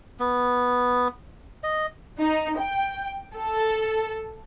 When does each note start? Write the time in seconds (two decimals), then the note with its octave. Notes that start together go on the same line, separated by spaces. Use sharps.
0.20 B3
1.64 D#5
2.21 D#4
2.59 G5
3.37 A4